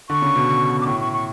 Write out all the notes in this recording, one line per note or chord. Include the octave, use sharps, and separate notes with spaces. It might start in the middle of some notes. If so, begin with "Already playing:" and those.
D3 C#6
C#3
B2
D6
A2 C#6
C#6
C#6